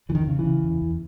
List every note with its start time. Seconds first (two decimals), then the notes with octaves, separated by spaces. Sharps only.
0.09 E2 E3
0.15 D#3
0.27 C#3
0.39 E3
0.45 C#3
0.63 E2
0.81 E2